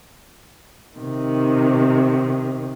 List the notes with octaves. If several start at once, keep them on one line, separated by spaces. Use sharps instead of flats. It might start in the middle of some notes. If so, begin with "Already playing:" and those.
C3 D#3